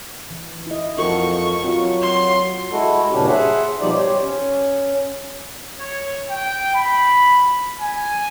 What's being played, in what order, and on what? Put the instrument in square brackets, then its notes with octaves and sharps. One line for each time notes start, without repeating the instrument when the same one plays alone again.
[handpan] E3
E4 D#5
[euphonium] F2 [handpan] F#4 A4 A#4 [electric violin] C#6
[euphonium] F#3 [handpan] C4 F4
[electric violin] C6
[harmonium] G#3 E4 F#4 A4
G2 A#2 C#3 C#4 D4 G4
G#4 C5 E5 F#5
B2 F3 G3 D#4 C5 D5
G4 C5 C#5
C#4
[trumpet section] C#5
G5
B5
G#5